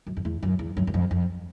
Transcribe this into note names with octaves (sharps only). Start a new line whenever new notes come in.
F#2
F2
E2
F#2
E2
F#2
F#2
F2
F2